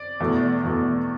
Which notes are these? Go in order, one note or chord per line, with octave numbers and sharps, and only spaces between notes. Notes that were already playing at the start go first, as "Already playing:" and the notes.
Already playing: D5
E2 B2 A3
E2 B2 A3